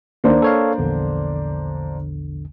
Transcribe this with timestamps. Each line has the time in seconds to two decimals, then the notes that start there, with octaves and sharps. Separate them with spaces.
0.24 D2 D#3 A#3 D4 C5
0.42 A4 C#5 F5
0.78 A#1 E2 D3